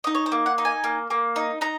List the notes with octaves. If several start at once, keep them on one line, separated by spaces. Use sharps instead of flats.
D#4 D#5
C#5
C5
A#3
F#5
D#4
G#5
A#3
A#3
D#4
D#4 A#5